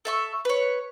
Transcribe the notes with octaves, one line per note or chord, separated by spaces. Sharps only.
A4 E5 C#6
B4 C#5